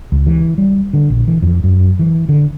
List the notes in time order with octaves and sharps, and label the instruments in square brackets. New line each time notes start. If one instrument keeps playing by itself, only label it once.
[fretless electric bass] C#2
E3
G3
D3
A#1
E3
F2
F#2
E3
D3